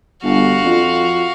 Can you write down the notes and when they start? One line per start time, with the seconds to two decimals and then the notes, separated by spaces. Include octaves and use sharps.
0.23 G1 F#4 F5
0.64 F2